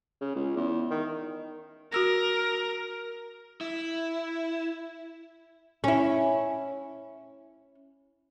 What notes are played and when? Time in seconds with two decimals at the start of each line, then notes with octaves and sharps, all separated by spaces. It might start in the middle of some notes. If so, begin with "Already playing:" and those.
0.21 C#3
0.36 C#2
0.56 E2
0.91 D#3
1.92 F#4 A#4 E6 A#6
3.61 E4
5.84 C#4 E4